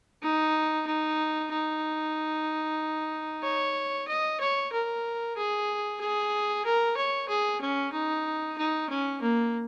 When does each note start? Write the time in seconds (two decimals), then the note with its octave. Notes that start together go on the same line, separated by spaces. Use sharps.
0.22 D#4
0.87 D#4
1.51 D#4
3.43 C#5
4.08 D#5
4.40 C#5
4.72 A#4
5.37 G#4
6.00 G#4
6.65 A#4
6.97 C#5
7.28 G#4
7.61 C#4
7.92 D#4
8.58 D#4
8.89 C#4
9.21 A#3